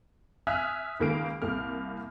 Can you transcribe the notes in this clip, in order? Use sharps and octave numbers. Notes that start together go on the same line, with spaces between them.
E5 G#5 D#6 F6 F#6
C#2 D#3 A#3 F5 D7
C2 A#3 F6